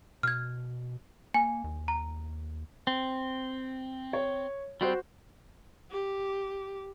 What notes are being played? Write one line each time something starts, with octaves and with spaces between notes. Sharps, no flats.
B2 F6 G#6
A#3 G#5
D#2
A#5
C4
C#5
G3 C4 F#4 C5
G4